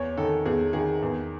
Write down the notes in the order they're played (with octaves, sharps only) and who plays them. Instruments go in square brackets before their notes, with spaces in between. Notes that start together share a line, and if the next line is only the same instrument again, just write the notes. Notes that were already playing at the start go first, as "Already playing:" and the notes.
Already playing: [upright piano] E2 C#5
D#3 A4
E2 G#4
D#3 G#4
E2